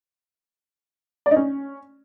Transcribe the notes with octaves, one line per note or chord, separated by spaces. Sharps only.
D5
D#4
C#4